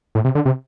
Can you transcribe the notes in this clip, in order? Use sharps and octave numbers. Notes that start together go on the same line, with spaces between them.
A2
C3
D3
C3